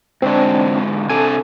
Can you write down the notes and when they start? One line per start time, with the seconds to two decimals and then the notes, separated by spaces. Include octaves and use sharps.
0.22 G#2 D3 C4 D4 C5
1.09 C3 D4 A4 G#5